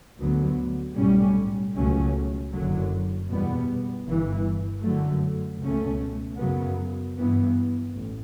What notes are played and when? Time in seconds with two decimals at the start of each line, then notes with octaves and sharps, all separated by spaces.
0.19 D2 D3 F#3 B3
0.97 B1 A2 G3 C#4
1.74 C#2 B2 F#3 A3 C#4
2.52 F#1 F#2 D3 F#3
3.29 E2 B2 G3 B3
4.06 G1 G2 E3
4.83 F#2 D3 F#3 A3
5.62 C#2 B2 A3 C#4
6.38 F#2 C#3 F#3 B3
7.15 G2 E3 B3
7.93 A1